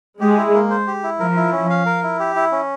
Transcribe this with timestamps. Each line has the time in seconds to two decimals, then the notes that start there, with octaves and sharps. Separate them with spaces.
0.21 G#3 G4
0.37 E4
0.53 A#3
0.70 C5
0.87 G4
1.03 E4
1.20 F3 A#4
1.36 E4
1.52 C#4
1.70 F5
1.86 A#4
2.03 E4
2.19 G4
2.35 E4
2.52 C#4